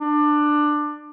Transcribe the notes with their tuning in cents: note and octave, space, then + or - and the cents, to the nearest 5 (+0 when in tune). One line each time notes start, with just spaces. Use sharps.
D4 +15